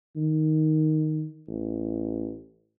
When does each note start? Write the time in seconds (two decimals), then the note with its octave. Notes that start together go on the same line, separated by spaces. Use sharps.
0.16 D#3
1.48 A1